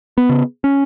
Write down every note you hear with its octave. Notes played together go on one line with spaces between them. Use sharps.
B3
C#3
C#4